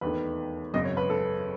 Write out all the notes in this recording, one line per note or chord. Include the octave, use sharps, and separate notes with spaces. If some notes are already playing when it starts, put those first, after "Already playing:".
E1 D#2 D#3 A3 B4
G#1 F#2 C#3 D#5
C#5
B4
A4